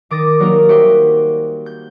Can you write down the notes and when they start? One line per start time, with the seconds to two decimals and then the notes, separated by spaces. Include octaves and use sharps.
0.10 D#3 D6 D#6 A6 A#6
0.40 F#3 G3 A#3 D#4 G4 A#4
0.69 F#4 G4 C5 E5 G5 C6
1.66 G6